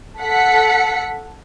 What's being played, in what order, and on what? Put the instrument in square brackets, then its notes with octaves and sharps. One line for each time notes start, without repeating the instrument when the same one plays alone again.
[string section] A4 F#5 B6 C#7